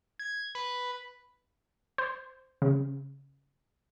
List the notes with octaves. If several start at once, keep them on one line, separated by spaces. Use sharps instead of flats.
G#6
B4
C5
C#3